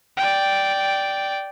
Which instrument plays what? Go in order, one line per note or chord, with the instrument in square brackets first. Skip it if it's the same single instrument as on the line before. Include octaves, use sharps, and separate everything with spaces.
[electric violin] D5 G5